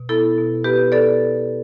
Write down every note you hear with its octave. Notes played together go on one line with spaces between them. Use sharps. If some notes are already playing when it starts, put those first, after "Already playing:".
Already playing: B2
B3 E4 A4
B2
B3 G4 B4
B3 A4 D5